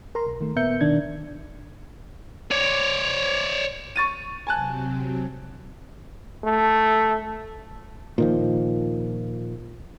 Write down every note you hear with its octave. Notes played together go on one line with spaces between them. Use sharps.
A#4 A#5 C6
B1
D#3 A3
A#2 B3 A#4 E5 G6 C#7
B2 D#3 D4 G#6
C#5 D5
C#6 A6 D#7
C3 F#3 C4 G#5 A5 F#6
A3
A#2 D#3 F3